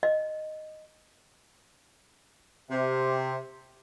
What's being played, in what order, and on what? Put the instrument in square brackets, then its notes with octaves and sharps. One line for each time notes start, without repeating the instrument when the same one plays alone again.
[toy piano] D#5
[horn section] C3